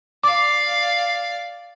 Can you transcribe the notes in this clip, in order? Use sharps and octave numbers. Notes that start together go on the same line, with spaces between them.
D5 F5 D6